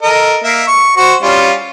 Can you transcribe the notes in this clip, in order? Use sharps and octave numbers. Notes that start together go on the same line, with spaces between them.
A4 A#4 D#5
A#3 E5
C#6
F#4 C5 C#6
G3 C#4 F4